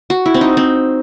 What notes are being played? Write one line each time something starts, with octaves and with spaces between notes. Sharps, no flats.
F#4
E4
C4
D#4
C4